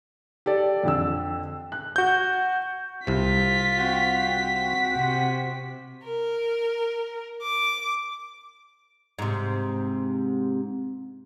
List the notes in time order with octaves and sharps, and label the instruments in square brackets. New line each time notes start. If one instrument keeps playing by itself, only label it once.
[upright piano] G4 A4 D5
F2 D3 E6
F#6
[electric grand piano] F#4 G6
[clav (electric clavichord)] C2 C3 [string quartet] F4 [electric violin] B6
[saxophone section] C4 F#4
[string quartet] C3
A#4
D6
[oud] G#2 C3